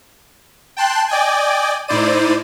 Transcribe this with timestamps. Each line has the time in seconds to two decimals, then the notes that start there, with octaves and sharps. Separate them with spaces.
0.77 G5 A5 C6 F#6
1.08 D5 D#5 G5 G#5
1.88 A2 D#4 E4 C5 D5 D#7